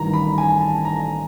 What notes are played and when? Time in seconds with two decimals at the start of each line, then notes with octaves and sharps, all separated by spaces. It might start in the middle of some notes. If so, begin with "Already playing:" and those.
Already playing: A1 G2 D#3 A#5
0.14 B5
0.38 G#5
0.61 A5
0.85 A#5